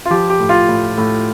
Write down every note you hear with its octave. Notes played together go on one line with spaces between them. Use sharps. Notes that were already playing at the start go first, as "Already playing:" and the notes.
F4
F3 G4
G4
A2
F4
A2
A2